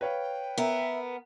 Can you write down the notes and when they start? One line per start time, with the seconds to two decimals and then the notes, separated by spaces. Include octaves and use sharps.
0.01 B4 C#5 F5 G5
0.58 B3 A#4 E5